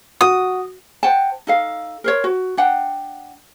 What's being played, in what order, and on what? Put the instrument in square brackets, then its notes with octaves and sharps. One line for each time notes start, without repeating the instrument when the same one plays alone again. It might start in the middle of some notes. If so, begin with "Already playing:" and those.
[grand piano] F#4 [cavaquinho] D#6
[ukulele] C5 F#5 G5 A5
D#4 A4 F5
A#4 C5 C#5
F#4
D4 F#5 G5